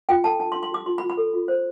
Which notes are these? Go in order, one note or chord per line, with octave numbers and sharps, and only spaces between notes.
F4 G5
A4 A5
D4 A5
C6
D4
C6
G4 D6
F4 C6
B5
F4
B5
A4
F4
C5